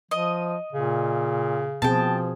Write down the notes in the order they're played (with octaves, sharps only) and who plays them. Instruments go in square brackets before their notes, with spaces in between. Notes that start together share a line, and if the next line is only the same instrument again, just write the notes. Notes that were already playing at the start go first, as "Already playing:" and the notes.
[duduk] F3 [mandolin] D#5
[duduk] A#2 [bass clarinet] C#3
[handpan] B2 C4 G#4 [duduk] F3 [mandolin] G5 A5